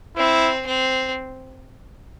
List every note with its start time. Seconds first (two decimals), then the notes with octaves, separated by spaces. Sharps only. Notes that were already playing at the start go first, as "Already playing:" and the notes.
0.17 C4 E4
0.67 C4